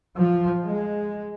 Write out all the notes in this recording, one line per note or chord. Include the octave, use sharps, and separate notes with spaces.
F3
G#3